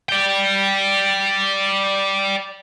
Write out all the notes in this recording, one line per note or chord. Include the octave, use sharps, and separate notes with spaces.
D5 G5